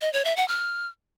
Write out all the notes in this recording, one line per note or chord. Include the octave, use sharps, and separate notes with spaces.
D#5
C#5
E5
F#5
F6